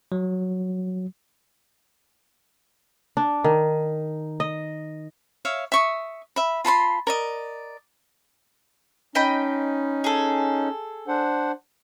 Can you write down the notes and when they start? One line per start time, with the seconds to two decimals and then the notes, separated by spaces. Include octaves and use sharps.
0.12 F#3
3.17 D4
3.44 D#3
4.40 D#5
5.45 C#5 E5 F5
5.72 E5 C#6 D#6
6.36 E5 B5
6.65 F4 A5 B5 C6
7.07 A#4 D5 D#5
9.15 C#4 D#4 D#5 G5 B5
10.04 G#4 A4
11.08 D4 C5 F#5